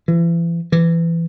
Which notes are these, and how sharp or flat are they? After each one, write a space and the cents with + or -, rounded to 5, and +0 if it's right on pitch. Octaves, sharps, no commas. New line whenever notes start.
E3 +35
E3 +20